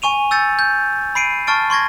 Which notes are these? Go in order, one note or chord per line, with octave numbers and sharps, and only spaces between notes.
G#5 C#6 D#7 F7
E6 G6 A6 C#7
G6
B5 C7 D7 D#7
A5 C#6 F6 A6 D7
C6 C#6 G#6 A#6